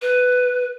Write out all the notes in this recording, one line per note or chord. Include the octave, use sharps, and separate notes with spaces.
B4